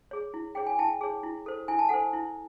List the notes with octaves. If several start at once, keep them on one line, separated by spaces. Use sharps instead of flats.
G#4 C#5
E4
G#4 C#5 G5
G#5
E4 G5 A5
G#4 C#5
E4
A4 C5
E4 G#5
A5
A4 C5 F#5 G#5
E4